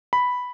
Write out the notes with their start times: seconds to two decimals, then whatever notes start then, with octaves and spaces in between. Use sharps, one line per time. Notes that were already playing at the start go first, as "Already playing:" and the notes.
0.13 B5